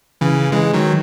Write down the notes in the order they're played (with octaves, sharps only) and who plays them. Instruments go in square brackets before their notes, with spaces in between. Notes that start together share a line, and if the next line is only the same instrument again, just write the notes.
[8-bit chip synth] C#3 E3
E3 G#3
D#3 F#3